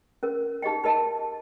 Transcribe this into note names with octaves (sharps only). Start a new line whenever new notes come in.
C#4 A#4
D#4 G4 D#5 G5
D#4 A#4 D#5 A5